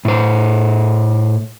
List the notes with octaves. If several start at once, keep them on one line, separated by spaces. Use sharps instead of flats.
A2 C5